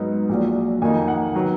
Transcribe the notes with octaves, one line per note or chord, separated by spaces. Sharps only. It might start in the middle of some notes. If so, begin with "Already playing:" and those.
Already playing: G#2 F#3 B3 D#4
A#1 A#2 F#3
F2 D#3 A#3 D#4 G#5
F#5
D#3 F#3 B3